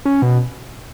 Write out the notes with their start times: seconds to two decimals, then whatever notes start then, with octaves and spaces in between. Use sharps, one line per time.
0.05 C#4
0.22 B2